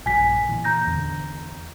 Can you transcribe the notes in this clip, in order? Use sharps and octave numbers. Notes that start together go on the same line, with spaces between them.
A#1 G2 G#5 B6
A#2 E3
A#5 G6 A#6
E2 D3